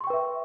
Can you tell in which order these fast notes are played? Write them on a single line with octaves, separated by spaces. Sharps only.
C6 C#6 G5 B4 E5